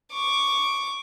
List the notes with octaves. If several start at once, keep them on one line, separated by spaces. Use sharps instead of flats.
C#6 D6